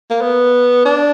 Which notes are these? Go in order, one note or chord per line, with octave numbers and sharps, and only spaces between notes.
A#3
B3
D4